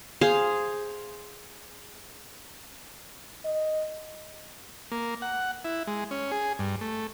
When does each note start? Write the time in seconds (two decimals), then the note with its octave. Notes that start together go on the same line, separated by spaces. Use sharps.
0.21 G#4 C5 F5
3.45 D#5
4.92 A#3
5.22 F#5
5.65 E4
5.87 G#3
6.11 C#4
6.31 G#4
6.59 G2
6.81 A3